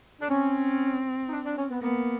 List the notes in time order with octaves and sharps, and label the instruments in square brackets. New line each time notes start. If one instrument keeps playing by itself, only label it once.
[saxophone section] D4
[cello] C4 [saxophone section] C#4
[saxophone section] D#4
D4
D4
C#4
B3
[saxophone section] A#3 [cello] B3